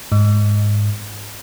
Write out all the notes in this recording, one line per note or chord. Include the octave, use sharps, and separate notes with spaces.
G#2